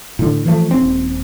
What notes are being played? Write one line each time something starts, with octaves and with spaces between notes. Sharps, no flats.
A2 D3
E3 F3 A3
D#1 C4